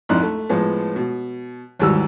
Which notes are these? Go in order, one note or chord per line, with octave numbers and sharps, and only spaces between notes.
A#1 F2 D#4 E4 C6 F#6
A3
A2 F3 G#3 B3
B2
D#2 G#2 E3 G3 F#4 E6